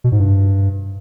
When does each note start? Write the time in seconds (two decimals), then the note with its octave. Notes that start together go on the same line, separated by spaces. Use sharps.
0.04 B2
0.12 G#2
0.20 G2